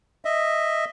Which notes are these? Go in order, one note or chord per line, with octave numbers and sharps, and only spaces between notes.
D#5 E5